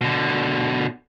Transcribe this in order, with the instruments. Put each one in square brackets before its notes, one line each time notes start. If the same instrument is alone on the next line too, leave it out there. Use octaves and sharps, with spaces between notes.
[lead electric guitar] B2 D3